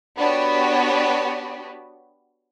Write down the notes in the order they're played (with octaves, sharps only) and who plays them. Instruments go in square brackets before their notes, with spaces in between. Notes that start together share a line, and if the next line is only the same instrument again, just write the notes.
[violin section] B3 D4 F#4 G4 B4 C#5